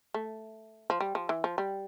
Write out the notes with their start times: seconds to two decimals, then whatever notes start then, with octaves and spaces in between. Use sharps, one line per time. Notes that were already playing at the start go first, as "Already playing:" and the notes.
0.14 A3
0.90 F3
1.01 G3
1.15 F3
1.29 E3
1.44 F3
1.58 G3